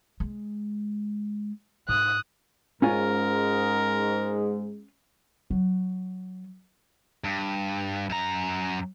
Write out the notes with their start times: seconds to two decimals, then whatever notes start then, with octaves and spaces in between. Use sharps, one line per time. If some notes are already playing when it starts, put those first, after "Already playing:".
0.20 G#3
1.89 G#2 D#6 F#6
2.82 G#2 G#3 C#4 F4 A#4 G#5
5.50 F#3
7.24 G2
8.10 F#2 A#5